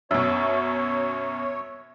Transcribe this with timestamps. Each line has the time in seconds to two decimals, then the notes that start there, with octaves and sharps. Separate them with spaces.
0.11 F#2 B2 C#5 E5